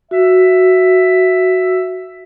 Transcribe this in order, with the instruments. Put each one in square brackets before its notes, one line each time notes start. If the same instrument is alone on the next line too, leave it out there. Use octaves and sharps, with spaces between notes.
[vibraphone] F#4 [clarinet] E5